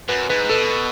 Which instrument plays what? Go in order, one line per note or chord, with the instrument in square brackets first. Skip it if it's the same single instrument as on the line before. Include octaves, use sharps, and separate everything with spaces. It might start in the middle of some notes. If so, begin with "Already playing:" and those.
[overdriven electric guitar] F#2 [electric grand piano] B4
[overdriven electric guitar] G#2 [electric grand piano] B4
[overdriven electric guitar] B2 [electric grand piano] A4